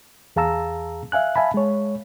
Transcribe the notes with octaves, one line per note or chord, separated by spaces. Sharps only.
E2 G#4 F5 A5 A#5 E6
E5 F5 G#5 F#6
E5 F5 G#5 A5 B5
G#3 C#5